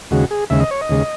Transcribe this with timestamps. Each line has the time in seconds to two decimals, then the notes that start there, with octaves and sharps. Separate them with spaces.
0.11 D#2 C#3 G#3 F#4
0.31 G#4
0.50 D#2 C#3 G#3 E5
0.60 D#5
0.71 C#5
0.81 D#5
0.90 D#2 C#3 G#3